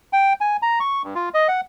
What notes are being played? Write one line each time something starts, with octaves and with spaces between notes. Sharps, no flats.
G5
G#5
A#5
C#6
G2
F4
D#5
F#5